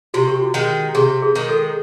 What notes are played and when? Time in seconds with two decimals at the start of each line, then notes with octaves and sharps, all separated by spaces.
0.14 C3 F#4
0.28 G4
0.41 F#4
0.54 D#3 G#3
0.95 C3 G#4
1.22 G#4
1.36 D#3 G#3
1.49 A4